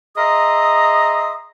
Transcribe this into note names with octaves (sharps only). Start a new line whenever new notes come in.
G#4 D#5 E5 A#5 C6 D#6